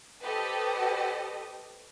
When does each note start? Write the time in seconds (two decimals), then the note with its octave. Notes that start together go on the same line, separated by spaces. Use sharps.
0.23 G4 A4 B4 C5 D#5